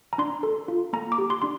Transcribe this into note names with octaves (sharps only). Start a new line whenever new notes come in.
A#5
D4 C6
A4
F4
A#3 A#5
D6
G4
C6
D4 C6